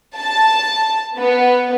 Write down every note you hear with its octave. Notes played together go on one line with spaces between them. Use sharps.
A5
B3